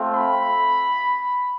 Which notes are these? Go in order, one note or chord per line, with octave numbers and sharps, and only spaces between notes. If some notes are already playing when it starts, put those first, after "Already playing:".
Already playing: A3 C4 F4
B5